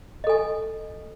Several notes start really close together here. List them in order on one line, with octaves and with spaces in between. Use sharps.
D#5 A4 G#5